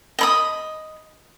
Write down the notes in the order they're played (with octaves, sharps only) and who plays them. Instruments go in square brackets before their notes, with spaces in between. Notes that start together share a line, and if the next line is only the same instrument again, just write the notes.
[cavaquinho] D#5 B5 D#6